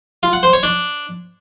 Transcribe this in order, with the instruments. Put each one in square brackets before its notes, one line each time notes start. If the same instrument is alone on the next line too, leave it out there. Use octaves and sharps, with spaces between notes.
[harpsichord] F4
F#5
C5
C#5
D4